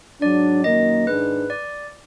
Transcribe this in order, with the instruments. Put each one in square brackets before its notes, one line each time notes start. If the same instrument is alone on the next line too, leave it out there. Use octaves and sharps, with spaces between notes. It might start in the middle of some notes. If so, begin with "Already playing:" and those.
[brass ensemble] G#2 F#3 D4 [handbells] D5
[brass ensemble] F#2 D#3 A#3 [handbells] D#5
[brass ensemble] G#2 D#3 G#3 D4 [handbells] B4
[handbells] D5